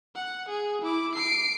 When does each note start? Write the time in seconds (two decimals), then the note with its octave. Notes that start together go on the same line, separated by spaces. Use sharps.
0.15 F#5
0.49 G#4
0.82 E4 D6
1.15 C7 D7